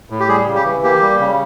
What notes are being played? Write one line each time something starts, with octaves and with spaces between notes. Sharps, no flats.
A2
G4
G3 G#4
C#3
G4
E3
A#3 G4
G3
C#3